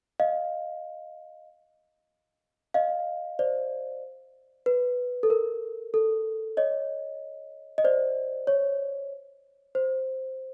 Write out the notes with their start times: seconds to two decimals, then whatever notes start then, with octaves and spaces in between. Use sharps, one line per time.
0.20 D#5 F5
2.74 D#5 F5
3.39 C5 D5
4.66 B4
5.23 A4
5.30 A#4
5.94 A4
6.57 C#5 D#5
7.78 D#5
7.84 C5 D5
8.47 C#5
9.75 C5